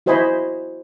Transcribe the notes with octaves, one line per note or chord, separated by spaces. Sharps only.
E4 F#4 C5 D#5 G#5 B5